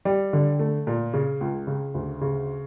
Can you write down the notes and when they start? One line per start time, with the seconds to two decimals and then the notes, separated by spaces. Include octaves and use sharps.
0.05 G3
0.33 D3
0.59 A3
0.87 A#2
1.14 C#3
1.41 C#2
1.67 C#3
1.94 D2
2.21 C#3